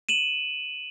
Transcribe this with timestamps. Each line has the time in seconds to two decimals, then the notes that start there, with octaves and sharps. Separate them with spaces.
0.09 D#7 E7 F#7